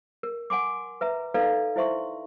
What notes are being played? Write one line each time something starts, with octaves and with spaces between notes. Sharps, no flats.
A#4
F#5 G#5 C6 D6
B4 E5 A#5
D#4 A4 B4 D5 F5 A#5
E4 C5 E5 C6 C#6